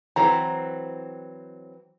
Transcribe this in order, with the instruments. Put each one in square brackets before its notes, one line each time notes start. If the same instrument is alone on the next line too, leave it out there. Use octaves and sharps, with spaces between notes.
[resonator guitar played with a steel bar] E3 F#3 C4 [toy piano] A#5